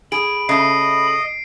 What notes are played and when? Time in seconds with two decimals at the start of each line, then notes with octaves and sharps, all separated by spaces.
0.12 G#4 B5 D7
0.49 C#3 A3 D#5 C7